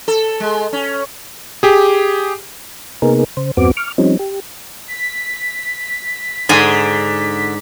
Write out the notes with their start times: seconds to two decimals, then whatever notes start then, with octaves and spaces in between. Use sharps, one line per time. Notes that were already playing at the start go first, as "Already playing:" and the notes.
0.08 A4
0.40 G#3
0.73 C#4
1.63 G4 G#4
3.02 C3 A#3 B3 D#4 G#4 A#4
3.37 C#3 C5
3.57 E2 G2 B3 C4 F#4 D6
3.77 C#6 D6 F6
3.98 F3 G3 C4 C#4 D#4
4.19 G4
4.88 B6
6.49 G#2 D3 G#5